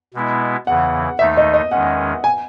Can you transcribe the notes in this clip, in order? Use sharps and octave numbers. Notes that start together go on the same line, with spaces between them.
B2 G#3 B3 E4
E2 C#3 E3 F#5
D#2 D#3 A3 D#4 E5
D#5
D#5
E2 D#3 G#3 C#4 F#5
G#5